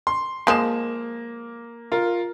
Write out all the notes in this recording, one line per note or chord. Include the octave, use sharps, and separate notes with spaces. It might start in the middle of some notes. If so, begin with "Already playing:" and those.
C6
F3 G#3 A#3 E7
F4 A#4